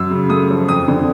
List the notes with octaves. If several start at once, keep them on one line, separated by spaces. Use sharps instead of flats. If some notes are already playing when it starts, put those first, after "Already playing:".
Already playing: F#2 E6
C#3
A3 D#6
F3
F2 D#6
D3